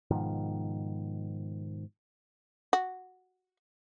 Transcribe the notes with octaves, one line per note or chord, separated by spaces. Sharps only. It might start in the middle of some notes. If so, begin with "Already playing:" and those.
G#2 B2 D#3 F3
F#4